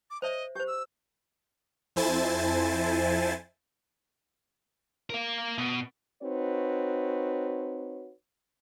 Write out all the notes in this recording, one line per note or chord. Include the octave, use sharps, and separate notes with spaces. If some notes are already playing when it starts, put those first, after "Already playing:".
D6
C5 C#5 D#5 E5
G4 C5 G6
E6
F2 E4 C5 G#5 A5 A6
A#4 F5
B2
C4 D#4 F#4 B4 C#5